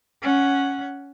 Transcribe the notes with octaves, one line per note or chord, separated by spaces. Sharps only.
C#4 F#5